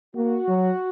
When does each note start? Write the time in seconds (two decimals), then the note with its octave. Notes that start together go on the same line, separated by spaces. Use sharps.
0.16 A#3 F#4
0.48 F#3